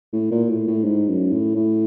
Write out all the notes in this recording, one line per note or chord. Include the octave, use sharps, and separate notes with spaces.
A2
A#2
A2
A2
G#2
F#2
A2
A2